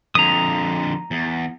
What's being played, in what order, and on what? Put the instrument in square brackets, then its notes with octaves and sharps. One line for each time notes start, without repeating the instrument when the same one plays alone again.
[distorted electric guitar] F2 D3 [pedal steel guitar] A#5 D#6
[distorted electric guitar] E2